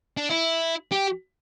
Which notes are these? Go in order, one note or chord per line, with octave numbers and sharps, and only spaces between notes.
D4
E4
G4